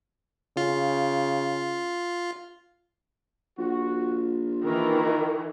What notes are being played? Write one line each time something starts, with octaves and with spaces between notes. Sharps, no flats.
C#3 F4
A#1 F4 F#4
D#3 E3 A#4